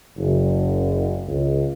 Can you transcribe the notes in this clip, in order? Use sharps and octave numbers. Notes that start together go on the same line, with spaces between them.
F#1
C#2